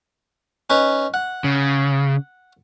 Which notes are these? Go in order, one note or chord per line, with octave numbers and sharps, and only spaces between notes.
C#4 D#4 B4
F#5
C#3